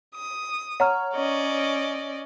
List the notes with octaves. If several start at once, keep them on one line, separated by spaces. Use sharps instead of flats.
D#6
C#5 F#5 A#5 F6
C#4 D5 D#5